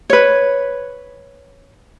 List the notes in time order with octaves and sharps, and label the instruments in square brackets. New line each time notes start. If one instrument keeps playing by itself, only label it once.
[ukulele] B4 C#5